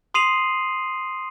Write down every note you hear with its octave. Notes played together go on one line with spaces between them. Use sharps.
C6 D#6 C7 D#7 F7 F#7